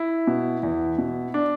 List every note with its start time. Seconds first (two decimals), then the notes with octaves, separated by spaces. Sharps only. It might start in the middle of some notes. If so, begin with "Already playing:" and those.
Already playing: E4
0.27 B2
0.63 E2
0.98 B2
1.34 D4